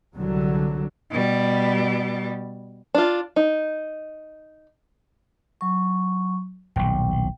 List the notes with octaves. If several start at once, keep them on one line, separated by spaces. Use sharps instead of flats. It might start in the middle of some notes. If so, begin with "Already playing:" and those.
C2 D3 F#3
B2 G3
D4 F4
D#4
F#3 C#6
D#1 B1 G5